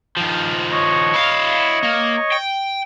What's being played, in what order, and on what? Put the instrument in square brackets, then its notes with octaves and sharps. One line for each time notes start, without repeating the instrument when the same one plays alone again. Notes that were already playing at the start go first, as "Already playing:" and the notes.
[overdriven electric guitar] D#3 F3
[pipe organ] C#5 D#5 C#6
[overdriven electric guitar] E4 F5
A#3
G5